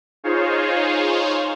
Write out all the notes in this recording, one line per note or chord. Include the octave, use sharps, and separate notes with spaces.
D#4 F4 G#4 C5 C#5 F5